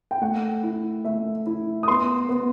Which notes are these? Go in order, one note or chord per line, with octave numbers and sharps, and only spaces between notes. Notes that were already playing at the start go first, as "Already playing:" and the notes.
G5
A3 F#5
E4
A3 E5
E4
D#6
B3 C6
B3